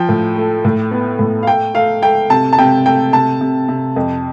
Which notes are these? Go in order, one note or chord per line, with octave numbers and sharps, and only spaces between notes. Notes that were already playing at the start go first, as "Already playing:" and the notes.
Already playing: F3 G5
A2
A3
A2
B3
A2
F5
A3 G5
A3 F5
A3 G5
C3 A5
A5
C3 G5
A3 G5
C3 A5
C3
C3
F2